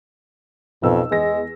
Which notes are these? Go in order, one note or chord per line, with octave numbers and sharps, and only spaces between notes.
B1 F2 B3 E6
E2 G#3 A#6